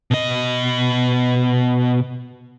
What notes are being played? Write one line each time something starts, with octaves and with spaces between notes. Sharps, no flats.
B2 D#5